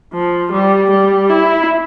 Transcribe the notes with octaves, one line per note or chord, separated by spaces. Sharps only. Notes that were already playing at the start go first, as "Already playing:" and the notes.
F3
G3
G3
E4